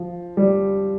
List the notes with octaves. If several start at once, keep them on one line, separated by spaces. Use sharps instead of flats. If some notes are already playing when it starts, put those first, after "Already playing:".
Already playing: F3
G3